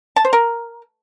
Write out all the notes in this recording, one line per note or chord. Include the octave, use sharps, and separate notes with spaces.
A5
C5
A#4